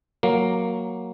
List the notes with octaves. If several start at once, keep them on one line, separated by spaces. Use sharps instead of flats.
F#3 A#3